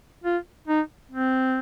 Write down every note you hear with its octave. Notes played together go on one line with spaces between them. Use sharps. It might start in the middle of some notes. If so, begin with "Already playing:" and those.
F4
D#4
C4